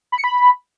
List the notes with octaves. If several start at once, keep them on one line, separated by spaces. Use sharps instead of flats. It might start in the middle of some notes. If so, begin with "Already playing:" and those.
B5
C#7
B5